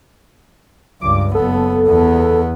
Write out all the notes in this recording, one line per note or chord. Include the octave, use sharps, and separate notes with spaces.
C#2 G2 D6
F#1 B3 A4
E2 B3